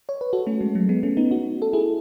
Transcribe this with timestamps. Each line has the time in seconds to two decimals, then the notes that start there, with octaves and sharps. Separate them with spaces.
0.09 C#5
0.21 B4
0.33 F#4 A4
0.47 A3 C#4
0.61 G#3
0.75 F#3 A3
0.89 G#3 B3
1.03 A3 C#4
1.17 B3 D#4
1.31 D#4 F#4
1.62 A4
1.73 E4 G#4